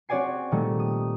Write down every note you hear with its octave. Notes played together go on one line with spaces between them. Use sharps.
C4 F#4 C#5 D5 G#5 C7
A#2 D#3 G3 A3
D#6